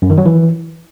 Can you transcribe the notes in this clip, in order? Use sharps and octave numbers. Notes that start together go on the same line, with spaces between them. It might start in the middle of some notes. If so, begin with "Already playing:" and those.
F#2
D#3
F#3
E3